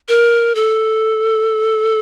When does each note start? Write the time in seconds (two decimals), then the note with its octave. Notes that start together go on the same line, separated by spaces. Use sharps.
0.08 A#4
0.55 A4